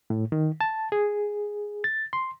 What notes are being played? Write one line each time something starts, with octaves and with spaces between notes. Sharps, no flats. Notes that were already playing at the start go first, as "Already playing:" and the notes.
A2
D#3
A5
G#4
A6
C6